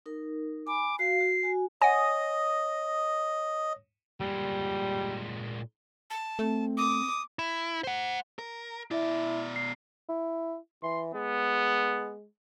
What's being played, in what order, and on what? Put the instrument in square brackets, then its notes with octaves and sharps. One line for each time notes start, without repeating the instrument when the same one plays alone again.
[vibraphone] D#4 A#4
[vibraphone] G#5 B5 [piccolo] D6
[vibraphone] F#4 F5 [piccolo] C7
[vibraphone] F#4
F#4 G#5
[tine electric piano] C#5 D#6 A#6 [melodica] D#5 [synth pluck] F#5 G#5
[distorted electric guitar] A#2 G#3 [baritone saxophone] G3
[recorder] A5
[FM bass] A3 [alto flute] C4
[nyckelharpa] D6 [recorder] D#6
[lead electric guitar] E4
C5 F#5
A#4
[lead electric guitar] B2 D5 [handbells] E4 E5
[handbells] C7
[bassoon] E4
[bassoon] E3 [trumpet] C6
[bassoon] G#3 [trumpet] B3